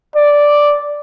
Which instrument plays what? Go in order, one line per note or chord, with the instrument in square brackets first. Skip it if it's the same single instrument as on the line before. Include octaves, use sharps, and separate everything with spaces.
[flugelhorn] D5